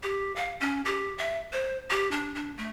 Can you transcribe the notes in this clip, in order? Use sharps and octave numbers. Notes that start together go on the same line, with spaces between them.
G4
F5
C#4
G4
E5
C5
G4
D4
D4
A3